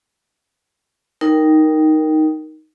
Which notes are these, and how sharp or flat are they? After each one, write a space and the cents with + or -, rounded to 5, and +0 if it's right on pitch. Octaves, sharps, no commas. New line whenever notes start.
D#4 +0 A#4 +0 G5 +0